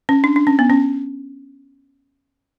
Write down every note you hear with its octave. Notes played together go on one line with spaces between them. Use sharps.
C#4
D4
D4
C#4
B3
C#4